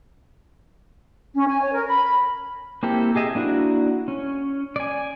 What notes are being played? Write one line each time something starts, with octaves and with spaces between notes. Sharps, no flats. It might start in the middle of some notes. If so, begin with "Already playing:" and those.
C#4
G#5
C#5
A#4
B5
A#3 C4 E4 G4 A4
G4 G#4 D#5 E5
A#3 D4 E4 F#4
C#4
D5 G#5